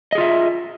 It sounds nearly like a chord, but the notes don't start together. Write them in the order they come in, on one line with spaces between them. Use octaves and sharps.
D#5 G#4 F4 E5